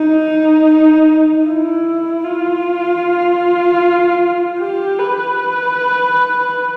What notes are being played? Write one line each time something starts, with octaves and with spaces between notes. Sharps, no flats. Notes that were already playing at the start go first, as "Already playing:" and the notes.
Already playing: D#4
E4
F4
G4
B4